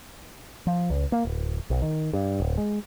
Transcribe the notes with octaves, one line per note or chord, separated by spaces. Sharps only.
F3
C#2
A#3
D1
B1
D#3
G2
D1
G#3